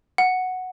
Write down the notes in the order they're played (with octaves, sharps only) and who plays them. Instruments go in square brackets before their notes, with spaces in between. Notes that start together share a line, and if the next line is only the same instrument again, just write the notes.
[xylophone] F#5